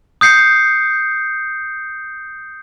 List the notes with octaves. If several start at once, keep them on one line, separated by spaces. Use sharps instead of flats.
D#6 G6 C7 C#7